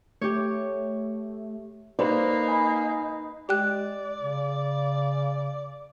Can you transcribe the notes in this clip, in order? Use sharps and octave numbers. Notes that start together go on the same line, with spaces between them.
A3 G4 C#5
A#3 D#4 B4 C5 D5
G#5 B5
G#3 G4 D5 G5 F#6
C#3